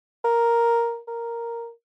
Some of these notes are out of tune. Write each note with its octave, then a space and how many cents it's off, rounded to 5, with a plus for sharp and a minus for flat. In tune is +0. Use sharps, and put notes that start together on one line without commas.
A#4 +5
A#4 +0